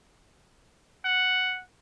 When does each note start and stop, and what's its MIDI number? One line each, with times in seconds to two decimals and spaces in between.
1.05 1.61 78